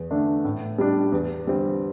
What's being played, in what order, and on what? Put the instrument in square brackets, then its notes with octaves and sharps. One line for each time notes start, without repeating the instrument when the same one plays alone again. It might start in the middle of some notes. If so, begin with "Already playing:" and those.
Already playing: [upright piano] E2
D3 A3 D4
A2
G3 D4
E2
D3 G3 C4